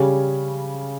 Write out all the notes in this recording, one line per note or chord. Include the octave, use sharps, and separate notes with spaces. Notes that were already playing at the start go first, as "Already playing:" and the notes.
Already playing: C#3 G3 C#4